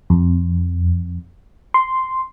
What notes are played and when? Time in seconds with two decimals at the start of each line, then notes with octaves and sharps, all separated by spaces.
0.10 F2
1.74 C6